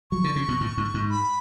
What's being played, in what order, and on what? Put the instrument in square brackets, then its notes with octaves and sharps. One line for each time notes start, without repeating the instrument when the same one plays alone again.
[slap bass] F#3 [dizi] C#6
[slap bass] D3
C#3
B2
A2
G#2
G#2
[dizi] B5